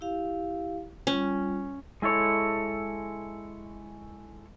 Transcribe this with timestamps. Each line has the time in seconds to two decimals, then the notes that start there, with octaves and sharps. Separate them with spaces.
0.01 E4 G4 F5
1.07 G3 C#4 F4
2.02 G#3 E4 A4 C#5